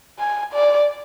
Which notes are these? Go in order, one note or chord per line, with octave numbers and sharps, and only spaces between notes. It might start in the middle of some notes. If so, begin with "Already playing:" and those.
G#5
D5